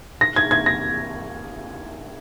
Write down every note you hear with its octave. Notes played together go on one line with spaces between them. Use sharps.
A#6
G#6
G#6
A#6